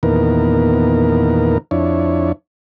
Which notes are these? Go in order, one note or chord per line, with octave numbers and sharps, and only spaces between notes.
E2 A#2 D#3 B3 A#4
F2 D4 E4 C#5